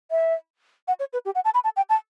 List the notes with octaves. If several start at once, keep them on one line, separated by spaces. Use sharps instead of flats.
E5
F#5
C#5
B4
G4
F#5
A5
B5
A5
G5
A5